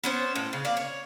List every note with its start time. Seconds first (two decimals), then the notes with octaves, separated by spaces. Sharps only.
0.04 B3 C#4 C5
0.35 A2
0.53 C#3
0.65 A#3 D5
0.77 C#5